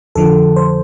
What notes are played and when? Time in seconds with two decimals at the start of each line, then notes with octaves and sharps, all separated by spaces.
0.15 F2 D3 F3 A4
0.56 C5